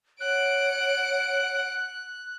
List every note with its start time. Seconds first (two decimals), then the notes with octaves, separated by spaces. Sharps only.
0.21 C#5 F#5 F#6 D7